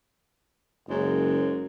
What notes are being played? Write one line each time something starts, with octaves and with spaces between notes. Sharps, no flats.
F#1 F#2 G#3